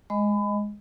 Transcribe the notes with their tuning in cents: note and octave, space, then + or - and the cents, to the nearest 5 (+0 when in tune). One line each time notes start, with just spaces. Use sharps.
G#3 +0 D#5 +0 B5 +30